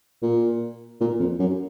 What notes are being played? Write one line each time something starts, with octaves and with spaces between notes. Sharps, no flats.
A#2
A#2
F2
F#2